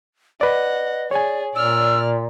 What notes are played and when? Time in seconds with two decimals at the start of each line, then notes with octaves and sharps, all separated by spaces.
0.41 B4 D5 D#5 F#5
1.11 G#4 C#5 D5 G#5
1.55 A#2 D5 E6 F6